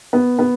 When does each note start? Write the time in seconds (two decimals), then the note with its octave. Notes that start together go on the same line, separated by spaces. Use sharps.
0.13 B3
0.39 B3